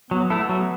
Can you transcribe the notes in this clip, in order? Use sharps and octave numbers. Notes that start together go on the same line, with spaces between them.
F#3 B3
A3 E4 A4
F#3